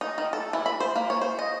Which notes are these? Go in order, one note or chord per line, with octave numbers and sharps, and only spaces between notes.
D#4
D#3
A4
E3
B5
C5
A#3
C#5
C5
D#5